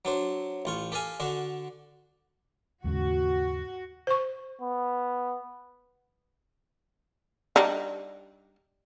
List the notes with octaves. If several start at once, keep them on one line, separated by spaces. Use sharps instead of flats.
F#3 D4 C5
A1 F4 C#6
G4 A4 F5 G#5
D3 D4 F#4
D#2 G#2 C#3 F#4
C5 C#6
B3
G3 D4 D#4